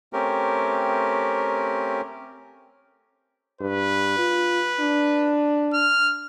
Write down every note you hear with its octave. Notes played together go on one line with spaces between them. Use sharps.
A3 C4 C#4 G4 A#4
G2 B4
F4
D4
F6